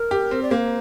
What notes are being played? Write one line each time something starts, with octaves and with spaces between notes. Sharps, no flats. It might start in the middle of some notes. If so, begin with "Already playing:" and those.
Already playing: A#4
G4
C4
D5
A#3 C5